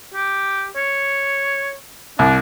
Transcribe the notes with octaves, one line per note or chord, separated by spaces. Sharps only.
G4
C#5
C2 D4